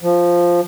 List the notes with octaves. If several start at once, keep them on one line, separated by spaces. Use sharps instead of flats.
F3